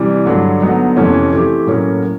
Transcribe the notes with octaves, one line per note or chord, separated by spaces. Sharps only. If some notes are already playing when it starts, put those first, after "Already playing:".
Already playing: C3 E3 G3
G2 D3 F#3
D3 F#3 B3 D#4
F2 C3 E3 A3 C#4
E3 A3 C4 E4 G4
A2 F#3 A#3 C#4